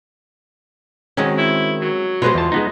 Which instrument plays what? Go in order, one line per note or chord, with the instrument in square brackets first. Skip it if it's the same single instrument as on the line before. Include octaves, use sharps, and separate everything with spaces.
[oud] D#3 C4 F#4 [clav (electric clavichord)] G#3 C#4
[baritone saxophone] E4
F#3
[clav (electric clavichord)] B2 G#3 [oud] F4 B4 C5
[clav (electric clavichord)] E2 A5
G#3 B3 D#4